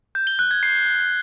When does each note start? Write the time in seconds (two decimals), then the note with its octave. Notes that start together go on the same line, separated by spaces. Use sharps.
0.15 G6
0.27 G7
0.39 F#6
0.51 G#6
0.63 C7